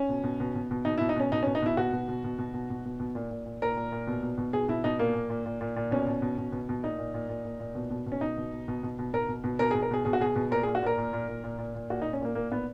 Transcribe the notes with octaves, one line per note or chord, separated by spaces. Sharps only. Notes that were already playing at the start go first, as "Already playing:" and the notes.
Already playing: C#4
B2
B2
B2
B2
B2
B2 D#4
B2 E4
D#4
B2 C#4
B2 D#4
C#4
B2
D#4
B2 E4
B2 F#4
B2
B2
B2
B2
B2
B2
B2
B2
A#2
A#2
A#2
A#2 A#4
A#2
A#2
B2
B2
B2
B2 G#4
B2 E4
B2 D#4
A#2 A#3
A#2
A#2
A#2
A#2
A#2
B2 C#4
B2
B2
B2
B2
B2
A#2 D#4
A#2
A#2
A#2
A#2
A#2
B2
B2
B2
C#4
B2 D#4
B2
B2
B2
B2
B2
B2 A#4
B2
B2
B2 A#4
G#4
B2
A#4
B2 G#4
B2 G#4
F#4
B2 G#4
B2
A#2 A#4
G#4
A#2
F#4
A#2 A#4
A#2
A#2
A#2
A#2
A#2
A#2
A#2 F#4
A#2 D#4
C#4
A#2 A#3
A#2 A#3
A#2 B3